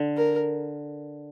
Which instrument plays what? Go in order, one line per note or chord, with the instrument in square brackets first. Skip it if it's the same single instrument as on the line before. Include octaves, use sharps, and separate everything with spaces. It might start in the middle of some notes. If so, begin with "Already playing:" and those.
Already playing: [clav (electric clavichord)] D3
[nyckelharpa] A#4